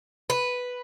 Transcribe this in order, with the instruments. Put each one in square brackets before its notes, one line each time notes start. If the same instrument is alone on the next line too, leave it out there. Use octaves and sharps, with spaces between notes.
[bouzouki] B4